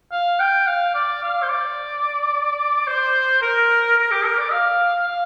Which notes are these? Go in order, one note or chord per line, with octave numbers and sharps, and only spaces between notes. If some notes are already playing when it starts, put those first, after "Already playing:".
F5
G5
F5
D5
F5
C5
D5
C5
A#4
A#4
G4
A#4
D5
F5
F5